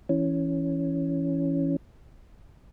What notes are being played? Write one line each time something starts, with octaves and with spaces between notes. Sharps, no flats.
E3 C#4